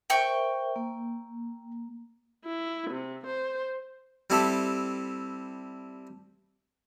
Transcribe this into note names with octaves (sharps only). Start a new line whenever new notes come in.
A#4 C5 E5 G5 C#6
A#3
E4
C3
C5
G3 C4 E4 G4 A4 E5